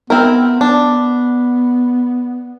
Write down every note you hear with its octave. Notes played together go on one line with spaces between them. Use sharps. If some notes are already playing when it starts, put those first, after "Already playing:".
B3 C4 E4 A#4
B3 D4